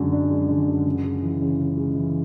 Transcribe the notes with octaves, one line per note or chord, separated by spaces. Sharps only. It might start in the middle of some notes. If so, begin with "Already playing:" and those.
Already playing: F#2 D3 G#3 D4
D4
G#3
D3
F#2
C#3
G#3
E3
C#3
C#3
G#3
E3